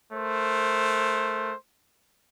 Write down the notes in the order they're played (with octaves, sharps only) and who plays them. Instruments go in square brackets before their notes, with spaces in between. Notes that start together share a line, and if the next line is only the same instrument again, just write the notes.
[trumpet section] A3 A#4 C5